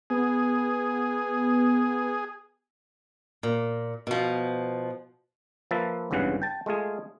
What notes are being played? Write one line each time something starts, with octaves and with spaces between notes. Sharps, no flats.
B3 G#4
A#2
B2 F3
F3 A#3 B4 E5 A5
G#1 E2 G2 C#3 E3 F#5
G5 A5
G#3 A3 F4 G#4